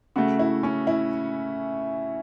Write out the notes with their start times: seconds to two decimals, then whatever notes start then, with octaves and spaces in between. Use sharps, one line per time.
0.16 C#3 A3 F#4
0.39 E4
0.63 C#4
0.87 E4